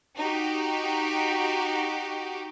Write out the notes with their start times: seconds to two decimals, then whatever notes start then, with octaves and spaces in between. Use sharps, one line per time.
0.17 D#4 F#4 G4